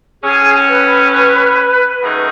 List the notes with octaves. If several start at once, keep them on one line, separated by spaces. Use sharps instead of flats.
A2 F#3 C#4 G#4 G#5
B4
F#2 D#3 A3 D#4 G#4